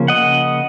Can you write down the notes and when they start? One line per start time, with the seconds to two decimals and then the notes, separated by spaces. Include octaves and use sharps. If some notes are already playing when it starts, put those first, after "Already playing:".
Already playing: C#3 F3 A#3 C#4
0.08 D#5 F#5